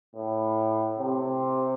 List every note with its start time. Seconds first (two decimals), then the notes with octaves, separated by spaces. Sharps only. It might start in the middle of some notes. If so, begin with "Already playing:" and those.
0.16 A2
0.99 C3